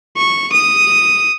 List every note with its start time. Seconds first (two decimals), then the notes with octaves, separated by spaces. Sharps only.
0.18 C#6
0.53 D#6